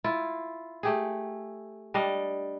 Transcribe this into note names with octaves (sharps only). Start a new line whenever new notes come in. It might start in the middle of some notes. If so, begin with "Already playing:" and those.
E4 F4
A3 G4 G#4
G3 D4 D#5 F5